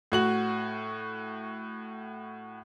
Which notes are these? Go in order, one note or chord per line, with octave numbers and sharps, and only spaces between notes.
A2 F#4 F#7